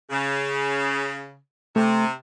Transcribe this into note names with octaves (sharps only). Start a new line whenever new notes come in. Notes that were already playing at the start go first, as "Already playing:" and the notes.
C#3
C3 A3